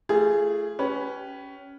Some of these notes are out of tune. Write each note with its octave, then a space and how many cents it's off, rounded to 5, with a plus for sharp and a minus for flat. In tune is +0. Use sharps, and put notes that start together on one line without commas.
A3 +0 F4 -35 G#4 +0
C#4 +10 G4 -25 B4 +0